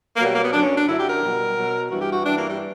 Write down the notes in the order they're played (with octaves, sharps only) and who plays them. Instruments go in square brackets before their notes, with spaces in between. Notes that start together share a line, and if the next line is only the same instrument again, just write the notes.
[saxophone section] B2 F#3 A#3
G3
A#3
B3
F#2 D3 F#3 D4
C#4
D4
F#2 D3 F#3 E4
G4
A#4
B2 G3
B2 F#3
G2 E3 G3 F#4
G4
F#4
G2 E3 G3 D4
A#3
G3